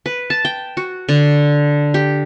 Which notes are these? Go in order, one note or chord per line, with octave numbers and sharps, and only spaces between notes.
B4
A5
G5
F#4
D3
G4